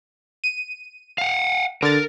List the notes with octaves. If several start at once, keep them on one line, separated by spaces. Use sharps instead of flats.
D#7
F5 F#5
D3 A#4 A6